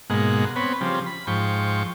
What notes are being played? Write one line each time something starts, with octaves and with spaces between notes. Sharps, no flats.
G#2 B2 G#3 A#3 F#5
B3 C4 B4 C#5
C#3 F3 G3 C4
B5
G#2 F3 G5 C#6